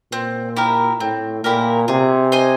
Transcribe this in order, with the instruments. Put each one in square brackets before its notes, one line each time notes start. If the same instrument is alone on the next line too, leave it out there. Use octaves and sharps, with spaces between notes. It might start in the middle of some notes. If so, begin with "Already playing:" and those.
[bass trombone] A#2 [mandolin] C4
[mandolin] E4 G4 A#4
[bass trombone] A2 [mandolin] C4
[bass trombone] A#2 [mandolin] E4 G4 A#4
[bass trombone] C3 [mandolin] G#4
[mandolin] C5 D#5 G#5